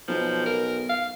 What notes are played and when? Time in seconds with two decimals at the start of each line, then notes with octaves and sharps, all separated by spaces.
0.08 B1 F3
0.46 A#4
0.89 F5